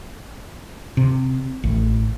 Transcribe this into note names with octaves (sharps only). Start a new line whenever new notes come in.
C3
A1